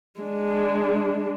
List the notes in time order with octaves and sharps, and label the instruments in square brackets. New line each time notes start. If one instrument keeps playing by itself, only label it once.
[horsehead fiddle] G#3 D4